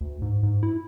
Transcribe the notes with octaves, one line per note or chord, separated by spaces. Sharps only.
D2
G#2
G#2
E4